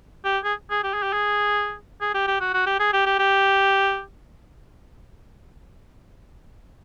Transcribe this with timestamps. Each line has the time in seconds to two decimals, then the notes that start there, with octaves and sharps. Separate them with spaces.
0.25 G4
0.44 G#4
0.71 G#4
0.84 G4
0.93 G#4
1.03 G4
1.13 G#4
2.01 G#4
2.14 G4
2.28 G4
2.40 F#4
2.54 F#4
2.66 G4
2.80 G#4
2.93 G4
3.06 G4
3.19 G4